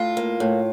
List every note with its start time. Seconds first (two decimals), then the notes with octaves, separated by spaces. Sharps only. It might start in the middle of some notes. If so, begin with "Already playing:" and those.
Already playing: A2 F4
0.17 A#3
0.40 A2